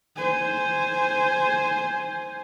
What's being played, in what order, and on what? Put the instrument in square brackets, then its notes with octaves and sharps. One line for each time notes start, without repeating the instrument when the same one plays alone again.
[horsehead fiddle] C5 G#5